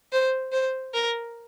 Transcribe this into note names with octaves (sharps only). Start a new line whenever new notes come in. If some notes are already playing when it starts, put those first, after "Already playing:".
C5
C5
A#4